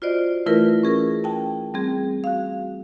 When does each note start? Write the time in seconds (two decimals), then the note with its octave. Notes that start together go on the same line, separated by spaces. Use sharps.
0.02 F4 F#4 C5 D5 D#5
0.46 E3 A3 E4 F4 A#4 B4
0.83 C#4 G#4 A#4
1.24 G5 A5
1.74 G3 C4 G#4
2.24 F#4 F5